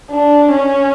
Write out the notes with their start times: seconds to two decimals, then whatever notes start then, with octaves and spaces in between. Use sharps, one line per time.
0.11 D4
0.52 C#4